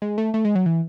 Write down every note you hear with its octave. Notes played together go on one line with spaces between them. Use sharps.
G#3
A3
A3
G#3
F#3
E3